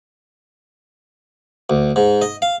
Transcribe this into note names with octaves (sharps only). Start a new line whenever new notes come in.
D2
G#2
D#5
F5